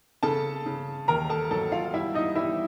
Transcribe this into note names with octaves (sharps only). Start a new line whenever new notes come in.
C#3 A4 A5
C#3
D#2 A#4 A#5
A4 A5
F#3 A4 A5
F4 F5
G3 E4 E5
D#4 D#5
G3 E4 E5